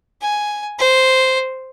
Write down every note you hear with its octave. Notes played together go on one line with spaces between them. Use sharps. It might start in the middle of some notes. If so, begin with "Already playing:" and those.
G#5
C5